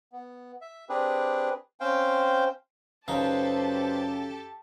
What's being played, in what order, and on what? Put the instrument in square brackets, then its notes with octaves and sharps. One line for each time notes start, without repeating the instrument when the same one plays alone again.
[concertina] B3
E5
C4 D4 G4 G#4 B4
C4 C#4 C5 F5 G5
[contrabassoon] F#2 [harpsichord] C#3 D#4 [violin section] G4 A4 A5 [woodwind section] B4 C5